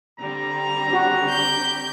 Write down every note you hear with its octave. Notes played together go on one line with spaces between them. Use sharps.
D3 G3 C4 A#5
F#4
G4 G6